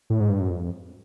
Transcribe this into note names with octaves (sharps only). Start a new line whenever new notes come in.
A2
G#2
G2
F#2
F2